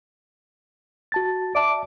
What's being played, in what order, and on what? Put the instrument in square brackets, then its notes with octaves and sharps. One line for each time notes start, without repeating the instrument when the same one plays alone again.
[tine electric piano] F#4 A5 A6
[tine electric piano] D5 E5 A5 [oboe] D6